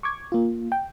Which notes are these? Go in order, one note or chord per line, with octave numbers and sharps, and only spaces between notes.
C#6 D6 G#6
A#3 F4
G5